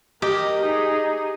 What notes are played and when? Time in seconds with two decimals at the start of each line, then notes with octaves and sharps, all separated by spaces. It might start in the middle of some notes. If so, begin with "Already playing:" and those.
0.22 G4 A#4 D#5
0.62 D#4 G#4